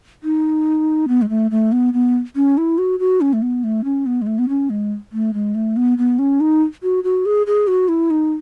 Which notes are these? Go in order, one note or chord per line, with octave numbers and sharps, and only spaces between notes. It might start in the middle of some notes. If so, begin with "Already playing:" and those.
D#4
B3
G#3
A3
A3
B3
B3
C#4
E4
F#4
F#4
C#4
A3
B3
A3
C#4
B3
G#3
A3
B3
C#4
G#3
A3
G#3
A3
B3
B3
C#4
D#4
F#4
F#4
G#4
G#4
F#4
E4
D#4